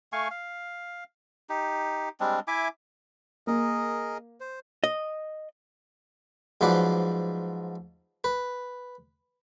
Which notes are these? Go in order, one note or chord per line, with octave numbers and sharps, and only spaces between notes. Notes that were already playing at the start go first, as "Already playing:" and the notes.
A3 F5 G#5 C#6
F5
D#4 G4
G3 G#3 C4 D4
E4 E5 G#5 D6
A#3 G#4 A#4 D#5
C5
D#5
G#2 F3 F#3 B4 D5
B4